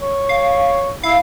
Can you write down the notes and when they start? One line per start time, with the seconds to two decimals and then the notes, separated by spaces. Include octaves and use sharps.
0.02 C#5
0.29 F5
1.03 E4 F5